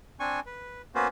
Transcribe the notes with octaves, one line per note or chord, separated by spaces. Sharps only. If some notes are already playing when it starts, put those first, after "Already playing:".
C4 D4 G#5 C#6
B4
A#3 B3 C#4 F#4 B4 C5